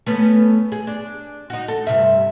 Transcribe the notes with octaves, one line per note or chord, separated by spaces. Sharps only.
A3 B3 C#4
G#4
D4
D#4 F#4
A4
G2 C3 E5